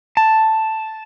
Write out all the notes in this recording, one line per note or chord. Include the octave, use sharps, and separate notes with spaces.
A5